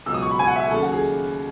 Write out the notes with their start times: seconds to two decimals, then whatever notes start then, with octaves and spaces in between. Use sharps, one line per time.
0.06 C#2 B2 F#3 E6
0.14 D#6
0.22 C#6
0.31 B5
0.39 G#5
0.47 F#5
0.56 E5
0.64 G#5
0.71 D#2 C#3 F#3 A4
0.82 F#4
0.93 G#4